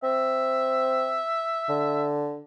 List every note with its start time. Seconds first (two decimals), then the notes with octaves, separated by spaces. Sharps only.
0.03 C4 E5
1.69 D3